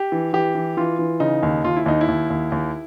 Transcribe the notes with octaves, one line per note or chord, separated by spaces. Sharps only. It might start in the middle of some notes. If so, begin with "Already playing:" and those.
Already playing: G4
E3
E3 G4
E3
E3 F4
E3
C#3 D#4
D#2
D#2 F4
E4
D#2 D#4
E4
D#2
D#2
D#2